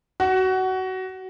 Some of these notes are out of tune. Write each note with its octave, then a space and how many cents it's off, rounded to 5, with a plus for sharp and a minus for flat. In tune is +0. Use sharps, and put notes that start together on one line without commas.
F#4 +20